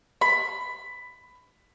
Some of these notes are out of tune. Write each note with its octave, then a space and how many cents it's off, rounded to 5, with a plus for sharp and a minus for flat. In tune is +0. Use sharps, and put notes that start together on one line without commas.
B5 +15